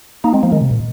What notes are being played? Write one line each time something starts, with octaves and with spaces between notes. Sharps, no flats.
A#3 D#4
G#3 C4
F3 A#3
D#3 G#3
C3
A#2